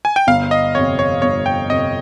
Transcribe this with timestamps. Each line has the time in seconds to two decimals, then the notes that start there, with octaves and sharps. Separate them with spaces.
0.05 G#5
0.16 G5
0.27 G1 F5
0.51 D#5
0.75 F2 C3 C#5
0.99 C#5
1.22 G1 C#5
1.46 G5
1.69 F2 C3 D#5